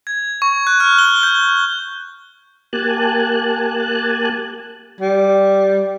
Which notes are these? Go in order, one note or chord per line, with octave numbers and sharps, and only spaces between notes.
G#6
C#6
F#6
F6
G7
G6
A#3 G4 G#5 A5 F#6
G3